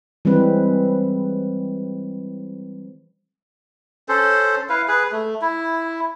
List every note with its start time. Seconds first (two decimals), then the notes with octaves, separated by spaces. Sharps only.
0.25 E3 G3 G#3 C4 B4
4.09 C#4 A4 C5
4.69 E4 B4 F5
4.88 G#4 B4
5.12 A3
5.41 E4